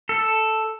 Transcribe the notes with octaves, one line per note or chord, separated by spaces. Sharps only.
A4